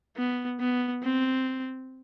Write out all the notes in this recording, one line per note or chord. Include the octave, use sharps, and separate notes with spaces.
B3
B3
C4